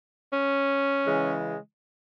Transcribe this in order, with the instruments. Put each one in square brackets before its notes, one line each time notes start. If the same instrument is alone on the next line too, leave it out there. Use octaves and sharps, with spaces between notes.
[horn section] C#4
C#3 E3 G#3